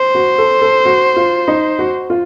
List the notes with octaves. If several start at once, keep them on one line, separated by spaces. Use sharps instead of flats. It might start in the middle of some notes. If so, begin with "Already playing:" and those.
Already playing: C5
F#4
A4
A4
F#4
F4
D#4
F#4
F4